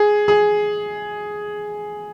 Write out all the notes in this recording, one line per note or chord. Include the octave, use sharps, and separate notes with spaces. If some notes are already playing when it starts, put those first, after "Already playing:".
Already playing: G#4
G#4